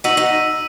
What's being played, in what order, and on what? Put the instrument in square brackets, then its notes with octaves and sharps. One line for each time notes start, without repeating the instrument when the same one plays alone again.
[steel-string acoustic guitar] D#4 F#4 [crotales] E6 B6 D#7 F#7
[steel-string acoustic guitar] D#4 F#4